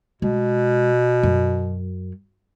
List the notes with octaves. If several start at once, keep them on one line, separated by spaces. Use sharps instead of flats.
B2 G#3
F#2